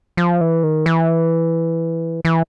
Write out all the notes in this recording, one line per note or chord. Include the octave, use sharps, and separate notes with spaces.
F3
E3
D#3
E3
E3